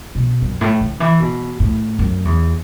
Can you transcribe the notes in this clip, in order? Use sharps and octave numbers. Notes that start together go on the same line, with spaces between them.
B2
F#2
A2
D3
E3
B2
A2
F#2
E2